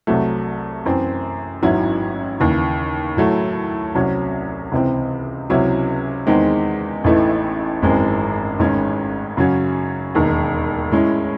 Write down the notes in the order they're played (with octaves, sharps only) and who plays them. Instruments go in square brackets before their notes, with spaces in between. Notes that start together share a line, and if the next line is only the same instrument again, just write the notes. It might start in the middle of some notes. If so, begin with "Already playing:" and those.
[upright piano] C2 C3 F#3 A3
F#2 E3 C4
A1 G#2 F#3 C#4 E4
D#2 C#3 E3
A2 F#3 A3
C2 C3 F#3 C#4
C#2 C3 E3 C4
C#2 C3 F#3 C#4 E4
E2 D#3 G#3 C4 D#4
A1 A2 E3 A3 D#4
G#1 F#2 E3 G#3 C4
A1 G#2 D#3 G#3 C#4
F#2 C#3 F#3 C#4
E1 D#2 D#3
A2 G#3 C#4 E4